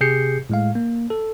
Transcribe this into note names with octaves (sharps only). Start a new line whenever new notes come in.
C3 G4 G#4 G6 C7 C#7
A2 G#3 F5
A#3
A4